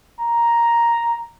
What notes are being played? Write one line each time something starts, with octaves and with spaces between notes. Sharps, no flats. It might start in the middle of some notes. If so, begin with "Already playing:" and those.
A#5